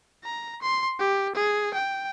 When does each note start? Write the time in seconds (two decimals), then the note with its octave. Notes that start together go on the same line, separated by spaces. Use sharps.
0.24 A#5
0.62 C6
0.99 G4
1.35 G#4
1.74 G5